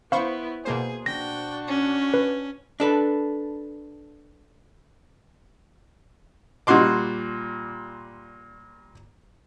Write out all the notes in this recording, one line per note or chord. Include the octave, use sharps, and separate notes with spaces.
B3 E4 C5 F5 B5 C#6
B2 A#3 G#4 C5
D4 F#4 G5 A#6
C#4
B4
D4 A4 B4
A#2 G3 F#4 C6 D6